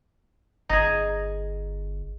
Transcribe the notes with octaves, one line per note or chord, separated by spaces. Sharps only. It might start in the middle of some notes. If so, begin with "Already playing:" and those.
G1 D#4 G#4